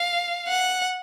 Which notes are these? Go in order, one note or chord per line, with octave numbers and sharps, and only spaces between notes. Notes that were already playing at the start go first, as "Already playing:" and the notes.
Already playing: F5
F#5